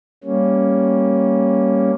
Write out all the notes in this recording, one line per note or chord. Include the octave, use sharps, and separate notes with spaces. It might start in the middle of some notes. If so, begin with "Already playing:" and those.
G3 A#3 C#4